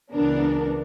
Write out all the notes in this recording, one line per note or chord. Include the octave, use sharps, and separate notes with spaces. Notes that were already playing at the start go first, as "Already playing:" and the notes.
C#2 E3 B3 D4 A#4